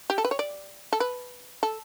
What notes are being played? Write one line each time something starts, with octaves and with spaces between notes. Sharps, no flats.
G4
A4
B4
C#5
D5
A4
B4
A4